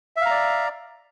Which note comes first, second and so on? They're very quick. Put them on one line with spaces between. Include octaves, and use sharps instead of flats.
E5 F5 A#5 D5